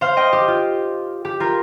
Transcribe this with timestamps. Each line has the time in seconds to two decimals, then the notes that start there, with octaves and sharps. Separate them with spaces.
0.01 C5 F5
0.17 D#5 G5
0.33 G4
0.48 F4
1.25 G4
1.40 F4 A#4